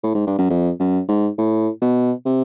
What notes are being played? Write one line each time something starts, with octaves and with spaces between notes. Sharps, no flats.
A2
G#2
G2
F#2
F2
F#2
G#2
A2
B2
C3